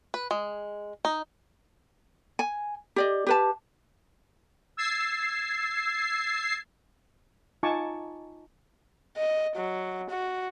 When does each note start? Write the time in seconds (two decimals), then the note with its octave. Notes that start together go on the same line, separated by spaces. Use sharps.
0.14 B4
0.31 G#3
1.05 D#4
2.39 G#5
2.96 G4 D5 D#5
3.27 G4 B4 A5
4.77 E6 G#6 A6 C7
7.63 D#4 F4 G#5 A5 C#6 D6
9.17 D#5
9.57 F#3
10.10 F#4